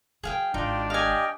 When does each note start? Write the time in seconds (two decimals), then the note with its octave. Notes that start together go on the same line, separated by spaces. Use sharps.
0.23 F#3 G#4 F5 G5
0.54 G#1 D4 D#4 F4 G5
0.90 G4 D#5 F5 G5 G#5